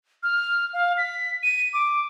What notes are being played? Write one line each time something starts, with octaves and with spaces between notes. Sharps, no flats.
F6
F5
B6
D#7
D6